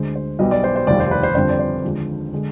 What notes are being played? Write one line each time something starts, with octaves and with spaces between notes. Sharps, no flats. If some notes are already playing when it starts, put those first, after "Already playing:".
Already playing: D2 D3 G#3 C5
C5
B1 B2 G3 D#5
D5
C5
C5
F1 D#2 D#3 G3 D5
C5
B4
C5
G1 F2 D3 G3 C5
D5
C5
D#2 D3 F3 G#3
D3 G#3